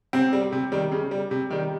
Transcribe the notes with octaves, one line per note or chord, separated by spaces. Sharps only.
C3 C4
G3
C3
D#3 G3
C#3
G3
C3
D#3 G3